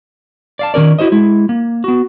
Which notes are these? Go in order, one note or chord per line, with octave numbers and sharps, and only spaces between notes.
D5 F5 A5
D#3 C#4 A#4 D5
E4 F#4 C5 D#5
G#3 E4
A#3
B3 F#4